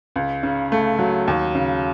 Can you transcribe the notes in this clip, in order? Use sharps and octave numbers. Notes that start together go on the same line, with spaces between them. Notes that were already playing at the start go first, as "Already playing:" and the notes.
C#2
C#3
A3
F#3
D#2
C#3